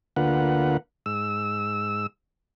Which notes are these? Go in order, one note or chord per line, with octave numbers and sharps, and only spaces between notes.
D2 D3 A#3 F4 B4 F#5
G#2 E6